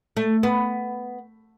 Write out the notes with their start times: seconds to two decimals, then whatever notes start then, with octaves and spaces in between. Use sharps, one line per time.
0.17 A3
0.43 B3